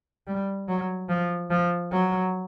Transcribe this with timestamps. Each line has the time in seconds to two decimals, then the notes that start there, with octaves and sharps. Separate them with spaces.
0.27 G3
0.68 F#3
1.09 F3
1.50 F3
1.92 F#3